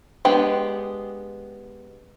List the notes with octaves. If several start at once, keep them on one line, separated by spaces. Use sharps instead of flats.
G#3 B3 D4 G4 G5